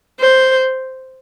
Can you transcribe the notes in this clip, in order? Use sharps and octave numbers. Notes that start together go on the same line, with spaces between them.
C5